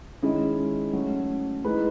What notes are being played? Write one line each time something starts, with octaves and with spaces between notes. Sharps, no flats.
D#3 G#3 C#4 E4 D#5
F#3 A3 C#4
A2 E3 G#3 D#4 B4